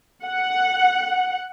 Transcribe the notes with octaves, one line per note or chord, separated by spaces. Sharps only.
F#5